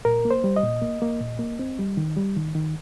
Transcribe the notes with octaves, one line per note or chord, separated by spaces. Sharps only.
A#2 A#4
A#3
C5
G3
D#5
A#2
A#3
A#3
A#2
A#3
C4
G3
D#3
G3
D#3
D#3